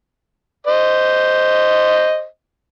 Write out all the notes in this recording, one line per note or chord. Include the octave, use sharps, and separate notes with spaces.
C5 D#5